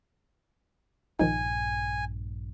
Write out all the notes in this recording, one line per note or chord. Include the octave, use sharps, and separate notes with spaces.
A#1 G2 D#3 F3 D#4 G#5